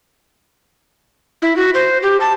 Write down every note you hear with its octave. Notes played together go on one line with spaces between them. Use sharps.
E4
F#4
C5
G4
A5